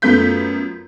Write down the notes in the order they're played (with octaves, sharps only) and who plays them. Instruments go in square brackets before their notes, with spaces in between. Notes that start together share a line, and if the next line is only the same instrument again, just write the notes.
[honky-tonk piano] F#2 A3 B3 F4 G6 B6